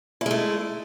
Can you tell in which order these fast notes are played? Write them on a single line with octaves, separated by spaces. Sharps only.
E4 G#3 A3